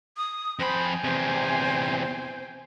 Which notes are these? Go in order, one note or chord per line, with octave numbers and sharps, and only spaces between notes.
D#6
F2 C5 G5 G#5 B5
E2 C3 C5